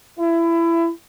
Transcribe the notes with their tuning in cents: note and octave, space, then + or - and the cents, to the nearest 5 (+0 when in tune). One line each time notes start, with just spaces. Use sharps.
E4 +25